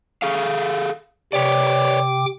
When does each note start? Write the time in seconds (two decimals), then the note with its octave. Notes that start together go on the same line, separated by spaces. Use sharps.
0.22 G#4 A4 F5
1.33 C3 B4 C#5 D5 G5 D6